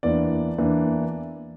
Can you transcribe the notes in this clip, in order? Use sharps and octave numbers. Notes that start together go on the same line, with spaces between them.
E2 E3 A#3 D4 D5
E2 E3 A#3 D4